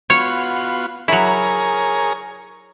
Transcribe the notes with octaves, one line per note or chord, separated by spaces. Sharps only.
B3 F4 F#4 C#5
F#3 E4 G#4 A#4 C#5